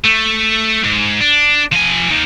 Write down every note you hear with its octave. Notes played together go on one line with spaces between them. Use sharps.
A3
G#2
D4
F3 G#5
D#2 D#3